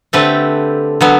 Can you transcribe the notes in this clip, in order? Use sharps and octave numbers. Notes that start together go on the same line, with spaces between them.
D3 A3 C4 G4 B4
D3 F#3 B3